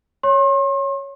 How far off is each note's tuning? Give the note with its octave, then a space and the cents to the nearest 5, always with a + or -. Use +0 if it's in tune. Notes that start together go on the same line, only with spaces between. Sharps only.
C#5 +0 C6 +40